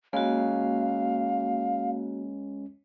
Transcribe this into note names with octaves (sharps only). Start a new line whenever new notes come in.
G#3 A#3 C#4 F#4 F5